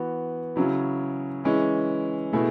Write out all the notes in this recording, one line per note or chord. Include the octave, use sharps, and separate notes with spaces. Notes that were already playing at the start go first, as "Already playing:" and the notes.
Already playing: E3 B3 F#4
C#3 F#3 C#4 E4
E3 G#3 C#4 E4
B2 A3 E4 G#4